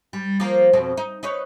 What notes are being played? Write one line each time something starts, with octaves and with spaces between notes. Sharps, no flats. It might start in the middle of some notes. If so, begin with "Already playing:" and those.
G3
F3 A#3
F2 B2 C4
D#4
D#4 B4 C#5